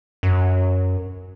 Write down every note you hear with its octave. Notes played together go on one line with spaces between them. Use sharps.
F#2